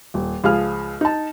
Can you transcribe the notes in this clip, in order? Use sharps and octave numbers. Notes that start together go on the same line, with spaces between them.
D#1
C#2 F3 G#4 F5 F6
D#4 A5